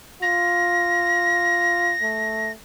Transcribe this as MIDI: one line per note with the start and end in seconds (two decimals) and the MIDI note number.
0.22 1.95 65
0.22 2.51 94
2.02 2.52 57